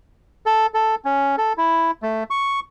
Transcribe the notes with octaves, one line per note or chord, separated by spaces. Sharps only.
A4
A4
C#4
A4
E4
A3
C#6